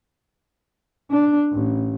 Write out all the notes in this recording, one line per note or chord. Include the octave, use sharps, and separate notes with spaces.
D4
A1